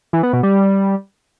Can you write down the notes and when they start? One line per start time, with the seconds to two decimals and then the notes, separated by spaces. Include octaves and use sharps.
0.13 E3
0.23 B3
0.33 B2
0.43 G3